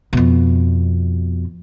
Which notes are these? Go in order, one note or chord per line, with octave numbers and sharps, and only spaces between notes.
F2 B2